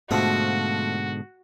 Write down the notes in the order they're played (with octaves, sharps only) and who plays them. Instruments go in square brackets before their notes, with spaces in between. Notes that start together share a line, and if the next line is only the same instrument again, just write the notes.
[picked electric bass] G#2 B2 D3 [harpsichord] F3 A3 D#6 [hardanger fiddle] F#4